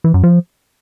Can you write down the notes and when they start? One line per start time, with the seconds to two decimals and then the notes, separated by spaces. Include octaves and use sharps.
0.04 E3
0.14 F#2
0.23 F3